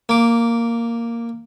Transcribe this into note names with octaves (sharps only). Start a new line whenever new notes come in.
A#3 D6